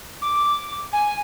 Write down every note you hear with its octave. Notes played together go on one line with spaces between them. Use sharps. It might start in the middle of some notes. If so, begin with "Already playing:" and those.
D6
G#5